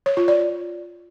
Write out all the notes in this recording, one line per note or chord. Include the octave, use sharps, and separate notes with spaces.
C#5
F4
D5